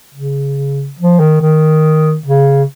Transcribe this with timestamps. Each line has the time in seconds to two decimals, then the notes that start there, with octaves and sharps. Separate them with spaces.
0.14 C#3
0.99 F3
1.20 D#3
1.41 D#3
2.26 C#3